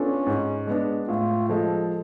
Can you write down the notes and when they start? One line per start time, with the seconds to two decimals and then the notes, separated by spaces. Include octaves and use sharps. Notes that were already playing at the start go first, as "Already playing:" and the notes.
Already playing: B3 C#4 D4 F4 A4
0.26 G#2
0.67 G#3 B3 D4
1.08 A2 F4
1.49 F3 G#3 A4